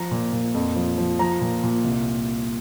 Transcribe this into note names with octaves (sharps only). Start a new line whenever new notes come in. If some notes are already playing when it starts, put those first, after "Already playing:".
Already playing: F3 A#5
A#2
A#2
F2
F3
F3
F3 A#5
A#2
A#2
C2